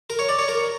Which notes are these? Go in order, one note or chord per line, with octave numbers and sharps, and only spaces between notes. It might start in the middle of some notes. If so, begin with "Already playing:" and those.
A#4
C#5
D5
C#5
A#4